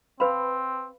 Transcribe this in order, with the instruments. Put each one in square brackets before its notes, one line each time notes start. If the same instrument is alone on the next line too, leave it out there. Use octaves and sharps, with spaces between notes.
[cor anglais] C4 [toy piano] B4 F5 B5